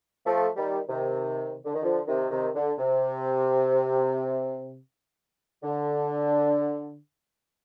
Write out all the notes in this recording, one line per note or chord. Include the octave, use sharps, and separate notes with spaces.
F3 A3
D#3 G3
C3 D#3
D3
D#3
D3 F3
C3 D#3
C3 D#3
D3
C3
D3